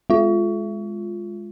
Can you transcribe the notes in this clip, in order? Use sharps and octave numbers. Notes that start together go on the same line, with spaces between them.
G#3 F4